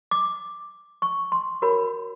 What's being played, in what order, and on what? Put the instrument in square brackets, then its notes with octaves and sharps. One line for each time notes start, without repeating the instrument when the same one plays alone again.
[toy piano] D6
C#6
C6
F#4 A#4 C#5 B5